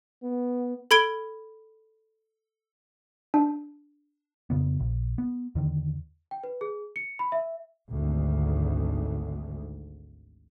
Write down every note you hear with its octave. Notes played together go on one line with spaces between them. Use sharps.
B3
A4 B5 G#6 D7 G7
D4
F2 C#3 B3
A#1
B3
E2 D3 D#3
G5
B4
G#4
C#7
B5
E5
G#1 D2 G#2